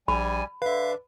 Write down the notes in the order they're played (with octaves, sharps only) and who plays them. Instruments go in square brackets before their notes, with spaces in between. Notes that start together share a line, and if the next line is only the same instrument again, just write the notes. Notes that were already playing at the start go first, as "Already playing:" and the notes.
[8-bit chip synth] A#1 [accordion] G3 G#5 [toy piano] B5
[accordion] D3 [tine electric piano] B4 [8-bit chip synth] E5 F5